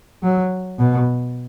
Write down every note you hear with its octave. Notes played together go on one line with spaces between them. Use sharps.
F#3
B2